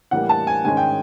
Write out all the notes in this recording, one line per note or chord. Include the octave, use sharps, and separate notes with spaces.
A2 E3 G3 A#3 F#5
A5
G#5
G#2 D#3 G#3 C#4 G#5
G5